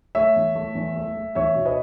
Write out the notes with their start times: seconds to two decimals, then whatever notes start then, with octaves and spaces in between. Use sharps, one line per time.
0.15 A3 C#5 E5
0.36 E2
0.55 A3
0.75 E2
0.96 A3
1.16 A3
1.35 E2 C#5 E5
1.55 B2
1.65 B4 D#5